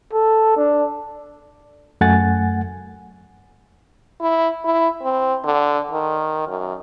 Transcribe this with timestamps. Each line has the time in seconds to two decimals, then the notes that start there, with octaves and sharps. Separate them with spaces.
0.12 A4
0.56 D4
2.01 F#2 A3 F#5 G#5 A6
4.21 E4
4.65 E4
5.03 C4
5.45 D3
5.91 D#3
6.47 F#2